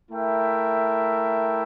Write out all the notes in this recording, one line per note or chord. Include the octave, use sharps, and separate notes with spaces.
A3 E4 A#4 E5 G5